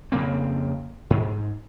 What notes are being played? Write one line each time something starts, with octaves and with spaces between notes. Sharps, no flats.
F2 C#3 A#3 C4
G#2